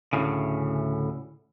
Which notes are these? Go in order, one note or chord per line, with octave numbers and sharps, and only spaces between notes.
D2 A2 C#3